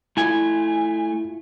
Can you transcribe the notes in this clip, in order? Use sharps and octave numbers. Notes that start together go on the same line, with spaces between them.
A3 E4 F4 G#5